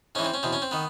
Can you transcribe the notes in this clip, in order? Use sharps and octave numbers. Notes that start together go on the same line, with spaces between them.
G#2 E3 C#4
C4
C#4
E2 B2 C4
C#4
C4
D#3 B3